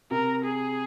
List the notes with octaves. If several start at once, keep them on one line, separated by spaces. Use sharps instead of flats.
C3 A#4
G#4